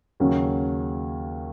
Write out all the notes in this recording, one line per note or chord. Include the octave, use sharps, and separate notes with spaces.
D#2 C#3 F#3 C#4